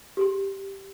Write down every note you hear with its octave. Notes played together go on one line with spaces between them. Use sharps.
G4 G#4 C6